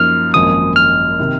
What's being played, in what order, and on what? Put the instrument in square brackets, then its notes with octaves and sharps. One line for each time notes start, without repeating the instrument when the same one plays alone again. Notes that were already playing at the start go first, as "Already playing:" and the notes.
Already playing: [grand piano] F#2 F3 A#3 D#4 [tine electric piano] F6
[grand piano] G#1 F#2 F3 A#3 [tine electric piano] D#6
[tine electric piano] F6
[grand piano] C3 D#3